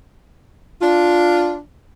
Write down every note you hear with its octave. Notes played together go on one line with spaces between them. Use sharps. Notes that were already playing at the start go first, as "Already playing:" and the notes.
D4 F4